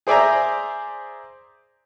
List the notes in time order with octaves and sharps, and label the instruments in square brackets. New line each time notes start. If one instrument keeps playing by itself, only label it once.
[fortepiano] G#4 C5 D5 E5 G#5 A#5